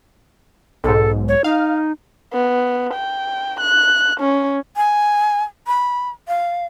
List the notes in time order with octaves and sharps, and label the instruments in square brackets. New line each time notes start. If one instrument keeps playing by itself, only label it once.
[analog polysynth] B1 G#2 [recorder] A4
[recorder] C#5
[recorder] D#4 [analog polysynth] F5
[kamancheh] B3
G5
F#6
C#4
[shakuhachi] G#5
B5
F5